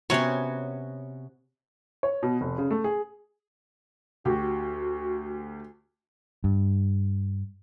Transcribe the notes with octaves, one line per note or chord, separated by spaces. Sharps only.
C3 B3 C#4 F#4 C#5
C#5
B2
F1
C#3
A3
G#4
D2 F#4 G4
G2